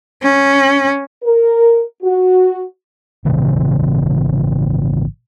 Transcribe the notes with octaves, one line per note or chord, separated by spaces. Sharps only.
C#4
A#4
F#4
G#1 A#2 C#3 E3